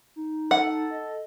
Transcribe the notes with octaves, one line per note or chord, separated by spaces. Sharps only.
D#4
A4 F#5
D#5